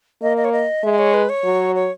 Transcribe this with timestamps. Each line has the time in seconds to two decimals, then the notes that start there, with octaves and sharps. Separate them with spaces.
0.22 A#3 D#5
0.37 D#5
0.45 C#5
0.52 D#5
0.83 G#3 E5
0.98 C#5
1.14 B4
1.29 C#5
1.44 F#3
1.75 C#5